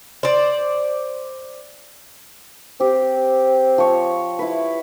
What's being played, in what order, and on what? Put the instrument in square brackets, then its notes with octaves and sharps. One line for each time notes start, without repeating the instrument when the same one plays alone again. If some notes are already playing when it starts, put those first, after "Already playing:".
[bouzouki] C5 D5
[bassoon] C4 [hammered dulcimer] G4
[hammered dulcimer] F3 C#5
E4 B4